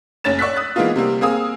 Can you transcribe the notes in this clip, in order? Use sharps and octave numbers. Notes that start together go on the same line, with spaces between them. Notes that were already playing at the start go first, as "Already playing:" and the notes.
F#1 C#4 C#5 A6 E7
D5 C#6 E6 F#6 B6
D#6 F#6 A6
E3 G#3 A#3 B3 D#4 F4
C3 G3 A#3 C4
A#3 C4 G#4 F5 D#6 E6